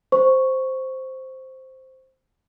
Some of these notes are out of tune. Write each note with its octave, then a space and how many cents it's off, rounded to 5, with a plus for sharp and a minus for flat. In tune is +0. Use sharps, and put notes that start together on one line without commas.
C5 +0 C#6 +0